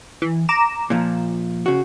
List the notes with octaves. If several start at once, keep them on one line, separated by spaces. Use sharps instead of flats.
E3
A#5 D6 E7
A#2 F3
C#3 F#4